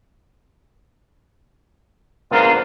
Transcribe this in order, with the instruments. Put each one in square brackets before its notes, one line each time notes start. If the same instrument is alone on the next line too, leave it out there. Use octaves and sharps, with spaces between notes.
[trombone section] E2 F4 A#4 [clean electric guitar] B3 D4 C5